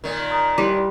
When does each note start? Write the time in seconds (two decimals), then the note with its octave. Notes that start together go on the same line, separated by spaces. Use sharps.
0.04 A#2 D#3
0.31 A#5 D#6
0.58 G3 E4 B4 C6 D6